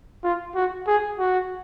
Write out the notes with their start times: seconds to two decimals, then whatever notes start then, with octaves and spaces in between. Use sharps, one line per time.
0.24 F4
0.55 F#4
0.87 G#4
1.19 F#4